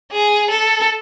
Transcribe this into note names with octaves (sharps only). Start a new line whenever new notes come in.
G#4
A4